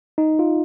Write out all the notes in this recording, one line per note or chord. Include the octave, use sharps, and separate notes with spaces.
D#4
F4